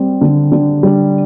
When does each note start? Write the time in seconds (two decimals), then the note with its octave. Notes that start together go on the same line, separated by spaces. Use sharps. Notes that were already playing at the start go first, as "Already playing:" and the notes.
Already playing: G3 C4
0.21 D3
0.52 D3
0.83 G3